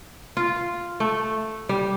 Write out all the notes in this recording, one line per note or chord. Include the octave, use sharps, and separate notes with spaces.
F4
A3
G3